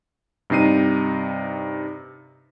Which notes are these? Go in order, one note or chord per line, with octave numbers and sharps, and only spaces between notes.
G2 C3 D#4 C7 D#7